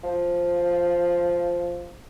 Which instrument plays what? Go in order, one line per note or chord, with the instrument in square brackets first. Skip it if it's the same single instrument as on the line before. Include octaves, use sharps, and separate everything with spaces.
[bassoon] F3